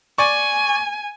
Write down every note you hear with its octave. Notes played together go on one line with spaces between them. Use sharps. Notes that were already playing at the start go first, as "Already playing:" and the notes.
D5 G#5 C#6